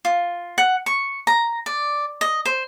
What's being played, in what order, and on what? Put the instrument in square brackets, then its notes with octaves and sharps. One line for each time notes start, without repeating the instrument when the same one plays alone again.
[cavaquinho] F4
F#5
C#6
A#5
D5
D#5
C5